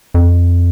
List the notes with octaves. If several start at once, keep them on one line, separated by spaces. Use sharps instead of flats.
F2